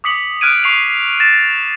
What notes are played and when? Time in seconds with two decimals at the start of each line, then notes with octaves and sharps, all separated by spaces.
0.04 D6 D#6 B6 C#7 F#7
0.41 D#6 F6 F#6 G#6 D7 D#7
0.64 C#6 C7 F7
0.84 C7
1.20 A6 A#6 E7